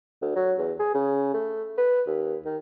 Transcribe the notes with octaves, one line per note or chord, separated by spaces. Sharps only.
D2
F#3
E2
G#4
C#3
A3
B4
D#2
D#3